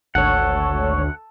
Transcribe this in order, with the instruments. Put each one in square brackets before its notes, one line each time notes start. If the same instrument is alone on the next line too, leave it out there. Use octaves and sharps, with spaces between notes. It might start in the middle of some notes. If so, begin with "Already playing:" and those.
[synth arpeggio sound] G#1 C#5 [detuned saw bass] D2 [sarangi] A4 [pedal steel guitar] F#5